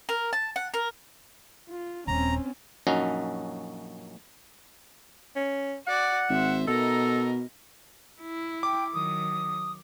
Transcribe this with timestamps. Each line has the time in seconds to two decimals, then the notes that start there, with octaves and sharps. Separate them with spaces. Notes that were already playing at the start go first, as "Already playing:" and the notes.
0.09 A#4
0.33 A5
0.56 F#5
0.74 A#4
1.69 F4
2.08 D#1 C4 C#4 A#5
2.87 A#1 F#2 C#4 D#4 F#4
5.35 C#4
5.87 F#4 D5 F#5
6.29 G#1 C5 E5
6.68 B2 D#4 A4 A#4
8.21 E4
8.63 G5 D6
8.93 D#3 F#3 D#6